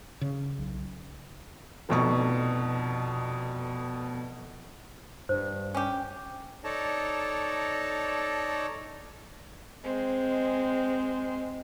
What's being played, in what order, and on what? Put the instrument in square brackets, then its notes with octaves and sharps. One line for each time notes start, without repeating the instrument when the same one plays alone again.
[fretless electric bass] C#3
[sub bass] B1
[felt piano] F1 F2 B2 C#6
[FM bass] G2 [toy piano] C5
[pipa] C#4 G4
[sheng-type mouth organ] D#4 A4 C#5 D5 A5 A#5
[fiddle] G#3 C4